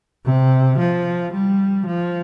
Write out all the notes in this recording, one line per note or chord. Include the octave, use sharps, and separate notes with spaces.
C3
F3
G3
F3